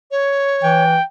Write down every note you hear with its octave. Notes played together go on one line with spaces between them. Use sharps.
C#5
E3 G5